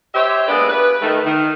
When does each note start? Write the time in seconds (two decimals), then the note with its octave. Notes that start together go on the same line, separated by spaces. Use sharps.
0.15 G4 C5 C#5 E5
0.48 G#3 A#3 B3 D4 B4 D5
0.69 B4
1.02 D#3 A3
1.25 D#3